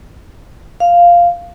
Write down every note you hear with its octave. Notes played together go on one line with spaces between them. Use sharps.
F5